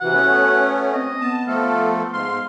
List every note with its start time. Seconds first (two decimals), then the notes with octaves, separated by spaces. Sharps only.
0.01 C3 E3 F#4 F#5
0.13 A3 B3 C#4
0.94 C4 D#5
1.21 B3 A5
1.48 F3 A3 A4 F5
2.13 G#2 F5 C6